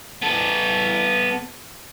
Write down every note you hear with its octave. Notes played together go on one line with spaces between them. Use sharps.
B3 A4